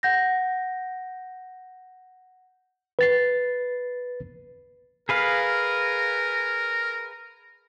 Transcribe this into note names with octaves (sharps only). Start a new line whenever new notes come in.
F#5 G6 A#6
B4 A6 C7
G#4 A#4 B4 F5